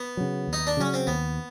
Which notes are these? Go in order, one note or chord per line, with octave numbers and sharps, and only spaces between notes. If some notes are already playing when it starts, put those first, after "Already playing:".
Already playing: B3
C#3 F#3
D#2
D#4
D4
C#3 F#3 C#4
C4
D#2 B3